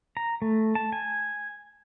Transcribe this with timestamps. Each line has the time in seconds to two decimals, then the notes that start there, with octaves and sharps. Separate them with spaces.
0.17 A#5
0.42 A3
0.75 A5
0.93 G#5